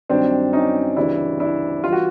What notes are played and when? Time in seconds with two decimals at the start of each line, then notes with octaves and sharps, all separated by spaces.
0.09 G2 D#3 F#3 C4 D4
0.53 C#4 D#4
0.96 D2 C#3 E3 G3 D4 E4
1.40 D4 E4
1.84 E3 G3 F4
1.92 F#4